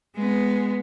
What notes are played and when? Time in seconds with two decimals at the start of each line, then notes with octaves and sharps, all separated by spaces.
0.16 G#3 B3